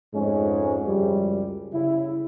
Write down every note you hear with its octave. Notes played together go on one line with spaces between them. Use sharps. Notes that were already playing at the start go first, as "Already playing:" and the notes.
F2 G#2 F3 G#3 A3 C#4
C#2 F#2 F3 G3
C#3 E4